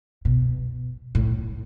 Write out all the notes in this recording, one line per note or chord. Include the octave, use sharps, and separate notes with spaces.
B2
A2